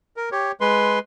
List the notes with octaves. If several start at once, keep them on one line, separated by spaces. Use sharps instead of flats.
A#4
G4 C#5
G#3 B4 C6